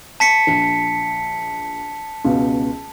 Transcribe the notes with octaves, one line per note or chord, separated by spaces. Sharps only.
A5 B6 C#7
A#1
C#2 B2